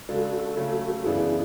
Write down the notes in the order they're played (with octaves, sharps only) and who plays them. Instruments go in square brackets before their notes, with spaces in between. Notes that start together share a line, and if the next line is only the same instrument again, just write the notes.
[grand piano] C#3 G#3 D4 [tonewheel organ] F#4 A4
[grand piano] C#3 F#3 A3 C#4
[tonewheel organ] A4
[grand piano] F#2 C#3 E3 B3 D4 [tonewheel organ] E4 G#4